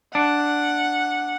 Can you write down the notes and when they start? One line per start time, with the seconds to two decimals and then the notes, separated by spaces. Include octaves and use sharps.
0.15 D4 F#5